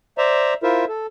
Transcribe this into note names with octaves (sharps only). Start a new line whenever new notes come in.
C5 D5 E5 A#5
E4 F4 A#4 C5 E5
A4